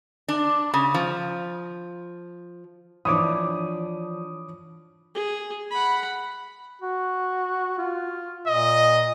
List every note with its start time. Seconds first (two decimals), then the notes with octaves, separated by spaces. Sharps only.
0.28 D4
0.74 C#3
0.94 F3
3.05 E3 F3 D4 C#5 B5 D6 D#6
5.15 G#4
5.71 F#5 B5
6.82 F#4
7.78 F4
8.47 A#2 D#5